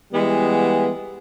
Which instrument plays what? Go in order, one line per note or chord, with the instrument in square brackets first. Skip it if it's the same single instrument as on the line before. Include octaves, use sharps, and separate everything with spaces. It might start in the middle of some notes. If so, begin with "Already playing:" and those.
[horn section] E3 G3 G#3 B3